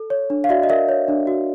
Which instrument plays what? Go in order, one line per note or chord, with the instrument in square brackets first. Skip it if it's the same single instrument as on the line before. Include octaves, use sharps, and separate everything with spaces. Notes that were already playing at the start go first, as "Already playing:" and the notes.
Already playing: [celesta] A4
C#5
D4
F5
F#4 D5 E5
D#5
A#4 D5 E5
C#5
D4
F#4